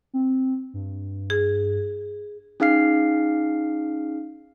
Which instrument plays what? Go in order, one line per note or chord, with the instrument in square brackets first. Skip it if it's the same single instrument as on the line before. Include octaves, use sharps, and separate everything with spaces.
[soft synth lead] C4
G2
[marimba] G#4
[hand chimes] C#4 D#4 G#4 F5 F6 C7